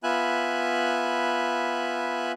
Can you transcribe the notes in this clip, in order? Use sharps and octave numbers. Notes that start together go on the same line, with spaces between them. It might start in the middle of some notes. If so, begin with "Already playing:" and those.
B3 F4 E5 G#5 B5 F#6